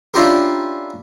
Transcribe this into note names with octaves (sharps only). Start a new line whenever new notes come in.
C#4 D4 E4 F4 G4 A#4